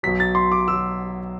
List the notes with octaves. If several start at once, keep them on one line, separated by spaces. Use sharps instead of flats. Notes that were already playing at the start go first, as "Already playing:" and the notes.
B1 B2 F#3 B6
A6
C6
D6
B1 B2 F#3 E6